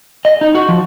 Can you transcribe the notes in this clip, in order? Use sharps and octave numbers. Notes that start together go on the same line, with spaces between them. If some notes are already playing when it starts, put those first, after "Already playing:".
D#5
D#4
F#4
F3